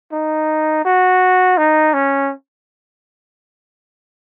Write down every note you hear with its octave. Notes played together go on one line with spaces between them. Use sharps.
D#4
F#4
D#4
C#4